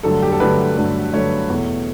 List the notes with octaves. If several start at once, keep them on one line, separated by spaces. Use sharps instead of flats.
G2 D3 F#3 A3 A4
G4
A4
G2 D3 F#3 A3 B4
G2 D3 F#3 A3
G2 D3 F#3 A3 C#5
E2 B2 A3